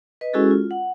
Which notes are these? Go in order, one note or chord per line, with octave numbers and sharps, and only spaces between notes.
B4 D#5
G#3 C#4 E4 F#4 G#4 A4
F4
F#5